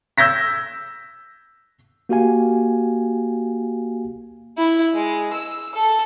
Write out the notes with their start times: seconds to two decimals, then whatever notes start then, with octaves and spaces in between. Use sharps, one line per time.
0.18 E6 G6 G#6 A#6 B6
2.09 A#3 F#4 G4 F5 G#5
4.58 E4
4.94 G#3
5.33 E6
5.75 A4